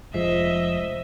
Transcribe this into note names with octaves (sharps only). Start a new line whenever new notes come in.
F1 F3 G#3 C5 D#5 E5